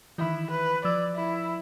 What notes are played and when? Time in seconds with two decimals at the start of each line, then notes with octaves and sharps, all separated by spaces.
0.18 D#3 E3 E4
0.50 B4
0.85 F3 D5 E6
1.16 E4